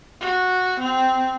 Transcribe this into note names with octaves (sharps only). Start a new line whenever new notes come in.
F#4
C4